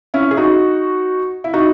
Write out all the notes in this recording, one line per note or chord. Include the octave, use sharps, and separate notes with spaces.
C#4 E4
G#4
D#4 F#4
E4
D#4 F#4